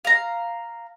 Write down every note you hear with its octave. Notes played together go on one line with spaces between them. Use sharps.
F5 A#5